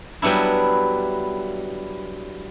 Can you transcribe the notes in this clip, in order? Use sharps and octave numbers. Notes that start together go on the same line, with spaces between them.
F#3 G3 B3 D4 E4